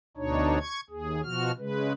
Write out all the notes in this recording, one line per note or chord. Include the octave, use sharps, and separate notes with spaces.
D2 B2 D4 D#4 C#5
C#6 G#6
D#2 G#4
B2 F3 F#4 F6
C#3 G#3 B4